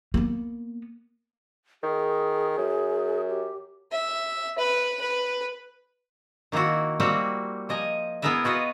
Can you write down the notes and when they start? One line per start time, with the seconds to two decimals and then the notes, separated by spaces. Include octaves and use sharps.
0.14 A#3 B3
1.83 D#3 G#4
2.58 F#2
3.29 G4
3.92 E5
4.58 B4
5.01 B4
6.52 D#3 A#3 C4 E4 F#4
7.00 G3 A#3 C4 F#4 E5
7.69 F3 D#5 G#5 A#5
8.22 B3 E4 G#4 A#4 B4 E5
8.44 F4 F#4 B4 D#5 F5